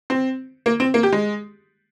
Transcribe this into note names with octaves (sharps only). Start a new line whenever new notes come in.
C4
A#3
C4
A#3
G4
G#3